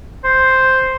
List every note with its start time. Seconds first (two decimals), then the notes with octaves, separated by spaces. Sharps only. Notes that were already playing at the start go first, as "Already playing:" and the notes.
0.24 C5